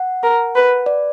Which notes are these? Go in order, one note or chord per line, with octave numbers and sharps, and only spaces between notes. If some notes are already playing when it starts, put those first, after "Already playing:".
Already playing: F#5
A#4
B4
D5